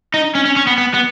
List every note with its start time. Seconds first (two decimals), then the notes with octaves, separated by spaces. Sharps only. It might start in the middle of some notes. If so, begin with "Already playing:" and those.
0.14 D#4
0.35 C#4
0.45 C#4
0.56 C#4
0.67 B3
0.78 B3
0.94 B3